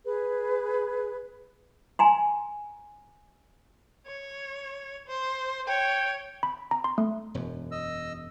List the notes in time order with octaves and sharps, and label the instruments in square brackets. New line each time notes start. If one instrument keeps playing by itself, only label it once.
[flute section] G#4 B4
[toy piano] G#5 A#5 C6
[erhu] C#5
C5
[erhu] C#5 [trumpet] G5
[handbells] B5
A#5
C6
A3
[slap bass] E1 F#2
[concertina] D#5 E6